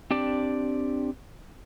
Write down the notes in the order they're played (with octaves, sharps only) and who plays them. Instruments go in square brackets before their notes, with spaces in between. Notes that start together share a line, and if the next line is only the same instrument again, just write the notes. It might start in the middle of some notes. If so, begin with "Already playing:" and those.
[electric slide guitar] C4 D4 G4 D5